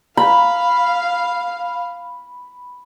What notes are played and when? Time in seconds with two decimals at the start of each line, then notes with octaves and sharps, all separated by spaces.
0.17 F5 B5